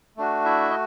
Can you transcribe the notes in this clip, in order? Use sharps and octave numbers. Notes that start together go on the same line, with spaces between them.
A3 D4 F#4
E4 E5
D#5